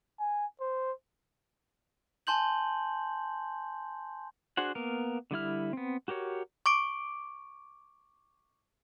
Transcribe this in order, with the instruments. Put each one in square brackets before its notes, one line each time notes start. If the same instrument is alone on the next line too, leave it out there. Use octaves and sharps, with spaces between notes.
[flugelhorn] G#5
C5
[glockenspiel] G#5 A5 C6 G6 F#7
[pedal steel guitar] D4 F#4 G#4 C5 F#5
A#3 B3 A#4
D3 G3 E4 F6
B3 C4
F#4 G4 A#4 C#5
[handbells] C#6 D6 D7